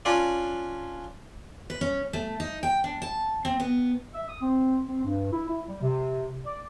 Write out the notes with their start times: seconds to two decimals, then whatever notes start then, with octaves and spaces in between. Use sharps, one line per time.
0.05 C#4 D4 F4 D5
1.70 B4
1.81 C#4
2.13 A3
2.40 D#4
2.63 G5
2.84 D4
3.02 A5
3.45 C4
3.60 B3
4.14 E5
4.28 D#6
4.41 C4
4.86 C4
5.05 G2
5.32 E4
5.48 E4
5.67 G3
5.82 C3
6.45 D5